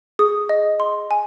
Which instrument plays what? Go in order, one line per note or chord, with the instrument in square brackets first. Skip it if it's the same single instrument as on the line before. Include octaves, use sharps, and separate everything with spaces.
[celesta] G#4 [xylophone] D#6
[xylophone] D#5
C6
G#5